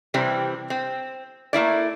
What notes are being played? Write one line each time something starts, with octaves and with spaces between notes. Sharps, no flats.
C3 E3 G3 C4
C4
A3 A#3 E4 D5